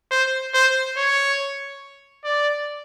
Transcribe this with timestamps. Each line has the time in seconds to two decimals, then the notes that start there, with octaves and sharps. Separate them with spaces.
0.11 C5
0.54 C5
0.97 C#5
2.25 D5